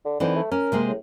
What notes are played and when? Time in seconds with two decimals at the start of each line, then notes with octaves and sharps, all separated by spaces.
0.05 D3
0.20 D3 E3 C4 D#4
0.36 A3
0.52 C#4 A#4
0.72 C3 G#3 A#3
0.88 A2